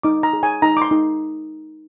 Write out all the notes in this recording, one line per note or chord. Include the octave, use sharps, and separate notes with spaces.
D#4 D6
A#5
G#4
G#5
D#4 A#5
D6
C6
D#4